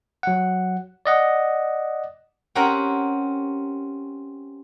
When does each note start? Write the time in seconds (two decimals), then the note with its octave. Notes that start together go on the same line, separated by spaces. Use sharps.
0.23 F#3 F#5
1.06 D5 D#5 F#5
2.55 C4 C#4 G4 A#4 F#5 A#5